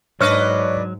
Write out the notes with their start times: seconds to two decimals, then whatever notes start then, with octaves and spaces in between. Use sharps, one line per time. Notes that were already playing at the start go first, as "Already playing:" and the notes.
0.21 G#2 F#3 D4 B4 C#5 D#5 C#6 F6